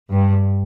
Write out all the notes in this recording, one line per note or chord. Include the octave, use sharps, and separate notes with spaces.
G2